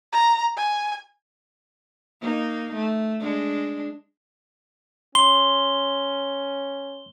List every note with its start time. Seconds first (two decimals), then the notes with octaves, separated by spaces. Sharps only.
0.12 A#5
0.57 G#5
2.21 A#3 D#4
2.75 A3
3.20 G#3 D4
5.15 C#4 C6 G7